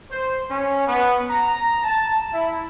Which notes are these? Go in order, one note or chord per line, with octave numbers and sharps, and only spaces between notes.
C5
C#4
B3
A#5
A5
E4